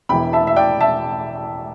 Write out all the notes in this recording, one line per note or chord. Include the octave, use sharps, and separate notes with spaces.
E1 E2 E3 G5 B5
E5 A5
E5
D5 G5
E5 A5